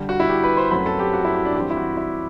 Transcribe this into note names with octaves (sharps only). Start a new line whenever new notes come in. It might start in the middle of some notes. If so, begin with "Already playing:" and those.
Already playing: G2 D3 G3
F#4
E4
G4
B4
C5
F#2 F#3 A3 C4 B4
A4
G4
F#4
E4
F#4
D4
G2 E3 G3 C4 G4
E4
F#4
E4